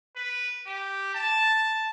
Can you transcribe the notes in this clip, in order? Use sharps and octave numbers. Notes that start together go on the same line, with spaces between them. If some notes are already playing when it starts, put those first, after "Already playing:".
B4
G4
A5